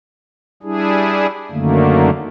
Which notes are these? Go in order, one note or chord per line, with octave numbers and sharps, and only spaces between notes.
G3 D4 E4 G#4
F#2 D3 D#3 A3 A#3